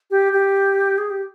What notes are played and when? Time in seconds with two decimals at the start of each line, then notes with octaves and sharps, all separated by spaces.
0.11 G4
0.32 G4
0.98 G#4
1.10 G4